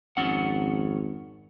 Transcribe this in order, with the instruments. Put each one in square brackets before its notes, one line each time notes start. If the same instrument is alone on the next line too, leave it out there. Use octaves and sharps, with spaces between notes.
[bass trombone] G#1 [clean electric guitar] F2 C#4 F#5